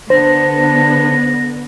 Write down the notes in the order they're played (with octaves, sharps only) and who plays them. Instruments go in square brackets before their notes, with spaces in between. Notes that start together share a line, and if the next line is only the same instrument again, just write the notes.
[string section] D3 B3 [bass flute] D4 [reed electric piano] C5 [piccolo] A#6